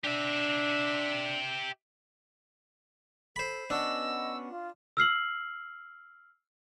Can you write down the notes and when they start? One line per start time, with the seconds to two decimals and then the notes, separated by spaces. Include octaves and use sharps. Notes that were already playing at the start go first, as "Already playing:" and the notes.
0.05 D4 G4 E5
3.36 A4 C5 B5
3.70 B3 C#4 D4 F#4 D#5 E6
4.49 F4
4.97 E6 F6 C7 F#7